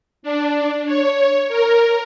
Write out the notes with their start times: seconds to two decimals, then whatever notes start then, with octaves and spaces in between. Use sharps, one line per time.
0.23 D4
0.85 C#5
1.48 A#4